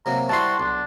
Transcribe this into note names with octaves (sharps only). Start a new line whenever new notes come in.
C3 F#3 A#3 A#5
G3 E4 F#4 C5 A5 C6
B1 D4